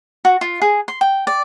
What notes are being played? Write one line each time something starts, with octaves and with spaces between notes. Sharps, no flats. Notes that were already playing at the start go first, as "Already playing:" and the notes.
F#4
F4
G#4
C6
G5
D5